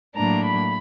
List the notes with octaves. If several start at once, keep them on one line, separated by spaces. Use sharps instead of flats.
A2 F#3 A#3 D4 A#5
B5